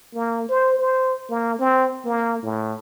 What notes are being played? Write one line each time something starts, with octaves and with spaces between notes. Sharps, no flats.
A#3
C5
C5
A#3
C4
A#3
A2